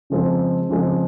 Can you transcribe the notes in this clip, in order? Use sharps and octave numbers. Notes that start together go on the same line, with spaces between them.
C#3 F3 G#3 C4
C#3 F3 G#3 C4